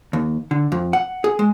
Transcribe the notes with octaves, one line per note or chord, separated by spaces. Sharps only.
D#2
D3
F2
F#5
G#4
G#3